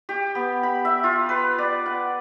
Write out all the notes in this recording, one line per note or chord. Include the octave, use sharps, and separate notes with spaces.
G4
B3
B5
E5
F4
B4
D5
F#5